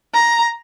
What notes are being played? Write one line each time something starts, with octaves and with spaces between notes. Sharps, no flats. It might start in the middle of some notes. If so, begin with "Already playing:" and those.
A#5